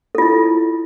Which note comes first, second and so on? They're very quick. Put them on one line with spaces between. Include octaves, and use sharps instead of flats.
A4 F4 E4